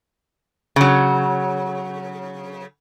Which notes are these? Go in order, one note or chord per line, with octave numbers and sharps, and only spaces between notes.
C#3 F#3